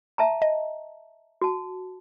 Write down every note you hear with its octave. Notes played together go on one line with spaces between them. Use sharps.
E5 A5 A#5
D#5
F#4 A5